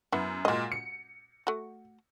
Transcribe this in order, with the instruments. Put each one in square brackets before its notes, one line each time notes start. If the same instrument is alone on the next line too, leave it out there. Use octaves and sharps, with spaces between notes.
[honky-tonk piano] F#2 [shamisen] B3 E4
[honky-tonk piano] A#2 G#3 [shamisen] F#4 D#5
[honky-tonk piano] C#7
[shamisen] A3 F#4